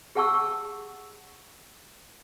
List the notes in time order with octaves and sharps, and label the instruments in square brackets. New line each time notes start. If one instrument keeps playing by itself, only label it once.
[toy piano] G4 G#4 F#5 A5 C#6 E6